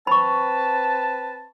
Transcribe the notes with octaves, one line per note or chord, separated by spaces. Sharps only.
C4 B4 A5 B5 C#6